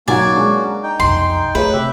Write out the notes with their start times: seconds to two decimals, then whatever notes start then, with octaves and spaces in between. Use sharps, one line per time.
0.08 B1 A#3 C#4 D#4 F#4 D5 F#5 G#5
0.36 G#3 D4
0.83 D#4 G5
1.00 B1 F2 C6
1.55 A3 G#4 B4 C#5
1.73 C3 G4 E5